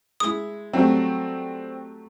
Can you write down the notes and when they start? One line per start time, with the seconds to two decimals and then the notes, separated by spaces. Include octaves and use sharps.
0.20 G#3 E4 D#6
0.73 F#3 G3 A3 C4